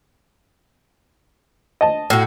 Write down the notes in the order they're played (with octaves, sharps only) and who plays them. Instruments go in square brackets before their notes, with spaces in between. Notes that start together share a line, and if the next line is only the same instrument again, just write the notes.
[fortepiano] D#5 A5
[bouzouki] A2 F#4